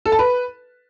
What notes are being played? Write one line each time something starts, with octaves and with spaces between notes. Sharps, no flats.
A4
A5
B4